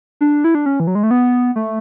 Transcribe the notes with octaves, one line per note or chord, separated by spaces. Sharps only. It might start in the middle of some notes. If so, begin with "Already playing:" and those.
D4
E4
D4
C#4
E3
F#3
G#3
A3
B3
A3